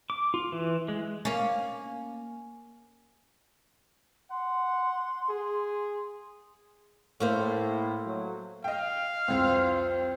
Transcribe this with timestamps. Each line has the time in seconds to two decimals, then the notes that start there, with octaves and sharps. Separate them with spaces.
0.10 D6
0.34 F4
0.52 E3
0.88 G#3
1.25 A#3 C#4
4.31 F#5 C6
5.29 G#4
7.20 A2 A3 A#3 C5
8.06 F#3
8.64 D#5 F5 G5
9.28 C2 F2 F3 C4